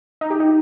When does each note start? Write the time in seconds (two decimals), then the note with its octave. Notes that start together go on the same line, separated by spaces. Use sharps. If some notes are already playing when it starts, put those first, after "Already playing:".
0.21 D#4
0.30 G4
0.40 D#4